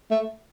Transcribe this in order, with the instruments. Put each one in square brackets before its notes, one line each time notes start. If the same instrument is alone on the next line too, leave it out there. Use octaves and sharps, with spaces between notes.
[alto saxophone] A3